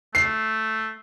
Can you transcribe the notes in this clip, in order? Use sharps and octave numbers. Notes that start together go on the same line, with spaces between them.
A3 C7